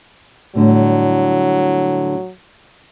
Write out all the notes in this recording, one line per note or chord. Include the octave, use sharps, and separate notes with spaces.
A2 D3 F#3 G3